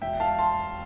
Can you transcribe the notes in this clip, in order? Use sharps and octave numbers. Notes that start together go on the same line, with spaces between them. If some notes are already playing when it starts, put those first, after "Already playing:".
E1 E5 G5
F5 A5
A5 C6